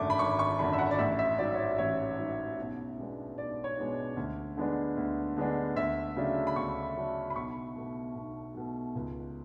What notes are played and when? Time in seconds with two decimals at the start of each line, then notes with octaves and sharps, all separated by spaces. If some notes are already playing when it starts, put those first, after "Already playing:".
Already playing: G#1 F#2 D3 A3 D4 D6
0.10 B5
0.19 G#1 C#6
0.39 C#6
0.59 F#2 D3 A3 D4 B5
0.73 E5
0.79 F#5
0.91 D5
0.99 A1 E5
1.19 E5
1.38 G#2 F#3 D5
1.54 C#5
1.58 D5
1.78 A1 C#5
2.18 G#2 F#3
2.58 B1
2.98 B2 G#3 B3 D4
3.38 B1 D5
3.64 C#5
3.78 B2 G#3 B3 D4
4.17 D2
4.57 D3 G#3 B3 D4
4.97 D2
5.37 D3 G#3 B3 D4
5.76 D2 E5
6.16 C#3 F#3 A3 D4
6.47 B5
6.56 D2 C#6
6.96 C#3 F#3 A3 D4
7.30 B5
7.35 B1 C#6
7.76 B2 A3
8.15 B1
8.55 B2 A3
8.95 C#2